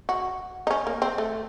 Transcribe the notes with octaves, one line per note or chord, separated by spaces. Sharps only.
F#4
D#4
C#4
A#3
C4
A3